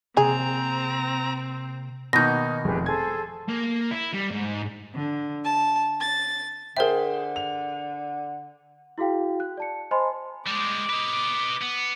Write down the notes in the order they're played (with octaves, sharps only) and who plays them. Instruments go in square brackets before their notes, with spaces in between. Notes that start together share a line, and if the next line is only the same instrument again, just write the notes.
[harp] C3 A#3 [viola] C4 [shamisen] G#4 [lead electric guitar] A#5
[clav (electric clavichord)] B2 D#3 A#3 [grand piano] B3 D#4 [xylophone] G6 A#6
[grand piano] F1 [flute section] G4 G#4 B4
[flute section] G#4 A4 C5 [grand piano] G#6
[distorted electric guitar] A#3
E4
G3
G#2
[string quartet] D3
A5
A6
[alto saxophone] D3 [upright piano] G#4 C5 G5 [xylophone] A#4 E5
[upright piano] F7
[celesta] E4 F#4 G#4 F5 G5
F#6
D5 A5 C#7
C5 D#5 G#5 A5 B5 C6
[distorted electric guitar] G3 G#3 [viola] D6
[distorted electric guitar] B4 D#5
B3